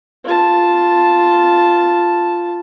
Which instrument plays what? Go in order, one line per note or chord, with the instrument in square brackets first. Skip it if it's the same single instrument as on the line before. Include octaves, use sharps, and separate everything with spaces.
[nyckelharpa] F4 A5